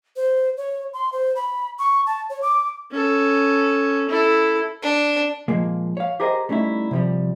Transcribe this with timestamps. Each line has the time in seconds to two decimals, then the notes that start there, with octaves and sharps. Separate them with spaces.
0.16 C5
0.57 C#5
0.94 C6
1.13 C5
1.36 B5
1.79 C#6
2.06 A5
2.30 C#5
2.42 D6
2.91 C#4 A4
4.09 E4 A4
4.82 D4
5.48 A#2 F3 G#3 A#3
5.97 C#5 F5
6.20 G4 G#4 A#4 C5 D#5
6.49 G3 A3 C#4 D#4 E4
6.91 C3 F3 G3